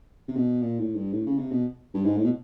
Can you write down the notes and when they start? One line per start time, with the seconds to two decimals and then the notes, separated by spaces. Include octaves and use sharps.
0.28 C3
0.36 B2
0.62 A#2
0.79 A2
0.95 G2
1.13 A2
1.27 C#3
1.39 C3
1.51 B2
1.94 G2
2.05 G#2
2.17 A2
2.24 B2